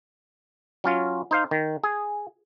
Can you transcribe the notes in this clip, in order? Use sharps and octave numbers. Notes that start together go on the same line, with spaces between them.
F#3 C#4 F4
D#4 C5 F5
D#3
G#4